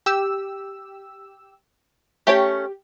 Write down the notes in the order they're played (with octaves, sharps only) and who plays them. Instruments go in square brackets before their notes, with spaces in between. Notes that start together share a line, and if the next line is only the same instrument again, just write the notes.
[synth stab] G4 E6
[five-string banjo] A3 C#4 C#5 [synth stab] G4